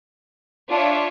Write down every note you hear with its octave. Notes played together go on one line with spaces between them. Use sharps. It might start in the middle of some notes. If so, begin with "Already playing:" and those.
D4 F4 C#5 E5